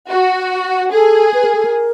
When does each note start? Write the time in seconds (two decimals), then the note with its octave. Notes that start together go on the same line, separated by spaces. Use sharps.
0.11 F#4
0.93 G#4 A4
1.34 B4
1.45 A#4
1.55 A4
1.65 A#4